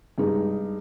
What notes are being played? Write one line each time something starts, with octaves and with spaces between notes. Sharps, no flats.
G2 G#3 D#4